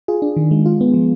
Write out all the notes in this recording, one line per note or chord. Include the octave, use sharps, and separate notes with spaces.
F4 G#4
D4
D#3
G#3
F4
B3
F3